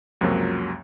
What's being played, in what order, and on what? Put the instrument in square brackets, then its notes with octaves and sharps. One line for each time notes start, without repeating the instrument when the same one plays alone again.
[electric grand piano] C#2 F#2 C3 F3 F#3 A#3